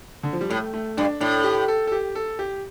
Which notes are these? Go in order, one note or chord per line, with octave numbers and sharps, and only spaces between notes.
D3
F3
G3
A2 A3
A3
G2 D4
A2 D4
G4
A4
A4
G4
A4
G4